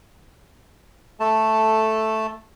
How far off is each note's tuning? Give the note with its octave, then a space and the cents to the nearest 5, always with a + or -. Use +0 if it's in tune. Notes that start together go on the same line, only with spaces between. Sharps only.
A3 +0 A4 +0 A5 +0